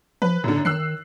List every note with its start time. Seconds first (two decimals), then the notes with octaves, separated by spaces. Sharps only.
0.22 F3 B4
0.44 F#2 A2 D3
0.65 D#3 E6 F#6 C7